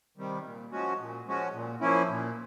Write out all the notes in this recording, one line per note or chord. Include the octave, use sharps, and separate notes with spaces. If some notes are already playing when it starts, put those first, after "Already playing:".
C3 D#3 G3
A#2
F3 G#3 C#4 F#4
A#2
F3 G#3 C#4 F#4
A#2
F3 A#3 C#4 E4
A#2